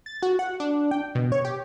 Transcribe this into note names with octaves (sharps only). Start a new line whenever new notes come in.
A6
F#4
F#5
D4
G5
B2
C#5
G4